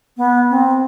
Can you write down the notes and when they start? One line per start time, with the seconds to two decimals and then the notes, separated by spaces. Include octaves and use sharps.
0.17 B3
0.50 C4